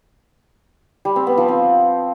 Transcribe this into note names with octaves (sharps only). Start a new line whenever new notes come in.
G3
C4
B3
F3
C4